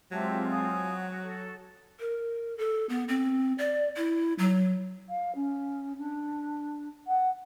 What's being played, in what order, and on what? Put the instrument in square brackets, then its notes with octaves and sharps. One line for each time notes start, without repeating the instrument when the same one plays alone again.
[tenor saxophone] F#3 [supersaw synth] G#3 C4 F4 [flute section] G4 E5 A5
[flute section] G#5 D#6
[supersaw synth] F#4
[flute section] A4
[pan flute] A#4
A4
B3
C4
D5
E4
F#3
[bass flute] F5
C#4
D4
F#5